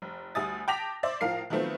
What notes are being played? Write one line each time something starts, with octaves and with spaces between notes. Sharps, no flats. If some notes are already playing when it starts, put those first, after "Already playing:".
F1
D2 G3 E5 G#5 D#6 A6
G5 A5 D6 A#6 B6 F7
C5 D5 E5
A2 F3 A#4 F5 C7
D#3 F3 F#3 A3 B3 C4